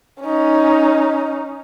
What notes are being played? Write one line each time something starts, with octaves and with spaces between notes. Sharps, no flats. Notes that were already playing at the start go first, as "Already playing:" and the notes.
C#4 D#4